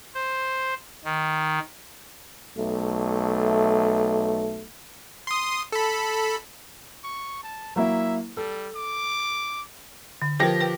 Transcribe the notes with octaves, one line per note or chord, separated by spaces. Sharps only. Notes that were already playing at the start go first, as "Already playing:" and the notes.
C5
D#3
B1 A3
C6 D#6
A4 B5
C#6
A5
F#3 A#3 E4 E5
G3 A4
D6
D3
F3 G4 A#4 B4 A#6
B4 G5